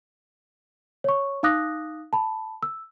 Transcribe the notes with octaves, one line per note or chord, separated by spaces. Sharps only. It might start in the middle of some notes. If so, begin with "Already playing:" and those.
C#5 C#6
D#4 F5 D6 D#6 F#6 A#6
A5 B5
E6